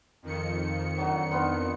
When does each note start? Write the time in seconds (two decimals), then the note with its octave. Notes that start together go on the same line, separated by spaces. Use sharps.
0.22 F2 D#3 C#7
0.98 D3 F#3
1.32 B3 D4 F4